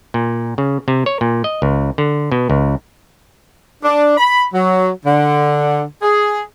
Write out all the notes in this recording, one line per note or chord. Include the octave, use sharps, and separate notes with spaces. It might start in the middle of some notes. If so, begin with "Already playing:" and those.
A#2
C#3
C3
C#5
A#2
D#5
C#2
D3
B2
C#2
D4
B5
F#3
D3
G#4